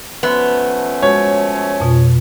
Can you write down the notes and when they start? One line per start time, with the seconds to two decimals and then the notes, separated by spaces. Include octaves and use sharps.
0.23 F3 A3 B3 C#4
1.02 G#3 F#4 C#5
1.80 F2 B2 F4